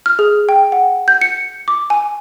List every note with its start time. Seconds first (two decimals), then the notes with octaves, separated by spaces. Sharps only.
0.06 F6
0.19 G#4
0.49 G5
0.72 F#5
1.08 G6
1.21 C#7
1.68 D6
1.90 G#5